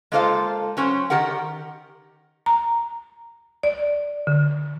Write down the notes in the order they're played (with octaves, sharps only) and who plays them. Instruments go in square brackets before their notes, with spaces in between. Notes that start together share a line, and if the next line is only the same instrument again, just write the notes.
[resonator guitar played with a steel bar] G#3 A#3 F4 A4 C5 F5
F#3 C#4 C5
D#3 G4 A#4 F#5
[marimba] A#5
D5
D3